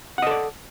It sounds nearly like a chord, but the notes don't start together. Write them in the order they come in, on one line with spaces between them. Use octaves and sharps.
F#5 D#5 A4 D5